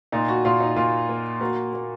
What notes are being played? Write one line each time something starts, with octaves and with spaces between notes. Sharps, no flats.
A#2 D#4
F#4
A#2 F4
D#4
A#2 F4
A#3
A#3 F#4
A#3